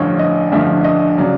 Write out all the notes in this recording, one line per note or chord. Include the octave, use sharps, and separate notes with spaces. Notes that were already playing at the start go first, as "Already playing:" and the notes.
Already playing: A1 G2 D3 F3 C#5
D#5
A1 G2 D3 F3 E5
D#5
C#3 F#3 D5